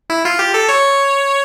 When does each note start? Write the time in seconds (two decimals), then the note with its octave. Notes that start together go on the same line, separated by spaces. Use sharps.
0.10 E4
0.25 F4
0.39 G4
0.54 A4
0.69 C#5